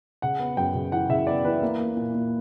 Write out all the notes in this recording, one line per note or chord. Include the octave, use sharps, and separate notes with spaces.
C#3 F#5
B3
F#2 G5
C#3
E3 F#5
C#3 E5
B3 D5
E3 B4
A#3
A#3
A#2
A#2